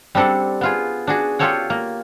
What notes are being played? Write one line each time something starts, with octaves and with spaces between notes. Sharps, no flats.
G3 C4 D4 A4 F#5
B3 F4 G#4
D4 F#4 G#4
F4 G4 A4 C#5 F#5
A#3